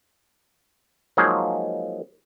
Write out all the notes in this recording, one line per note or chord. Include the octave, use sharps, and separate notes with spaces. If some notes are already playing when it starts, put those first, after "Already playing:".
F3 F#3 G#3 A#3 D#4 G#4